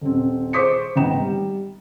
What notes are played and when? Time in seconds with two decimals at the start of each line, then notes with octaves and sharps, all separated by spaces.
0.01 D#1 C4
0.53 G#4 C5 C#6 D6 B6 C#7
0.96 G#1 B3 G5 A#5 E7
1.20 G3